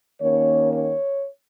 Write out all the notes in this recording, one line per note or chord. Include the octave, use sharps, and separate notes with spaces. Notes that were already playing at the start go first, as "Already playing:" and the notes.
D#2 D#3 A#3 C#4 C#5
C#5